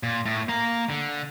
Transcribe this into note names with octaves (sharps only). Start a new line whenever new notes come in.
A#2
A2
A#3 A#5
D3